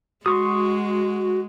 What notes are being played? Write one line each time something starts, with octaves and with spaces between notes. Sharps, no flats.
G#3 F#4 C6 C#6 D#6